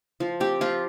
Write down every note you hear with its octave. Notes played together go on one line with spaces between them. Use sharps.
F3
C4 G4
F3 F4